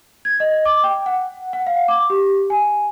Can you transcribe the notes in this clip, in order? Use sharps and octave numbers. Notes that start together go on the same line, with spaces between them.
G#6
D#5
D6
G5
F#5
F#5
F5
D6
G4
G#5